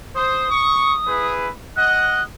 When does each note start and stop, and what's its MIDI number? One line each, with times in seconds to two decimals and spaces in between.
0.15 0.48 72
0.15 1.32 87
0.49 0.93 85
1.06 1.48 64
1.06 1.48 68
1.06 1.48 71
1.76 2.22 75
1.76 2.22 78
1.76 2.23 90